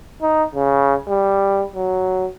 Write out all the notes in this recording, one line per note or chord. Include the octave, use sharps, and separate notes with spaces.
D#4
C#3
G3
F#3